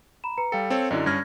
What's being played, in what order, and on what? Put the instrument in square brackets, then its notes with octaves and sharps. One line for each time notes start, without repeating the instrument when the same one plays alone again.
[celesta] A#5 B5 E7
B4 A#5 C#7
[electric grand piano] G3 A4 [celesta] F5 G5 C#7
[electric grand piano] C4 A4 C#5
[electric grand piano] F#2 D3 F#3 [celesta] E4 D5 D#5
[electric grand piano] G2 C#4 A#6 [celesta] F6 G#6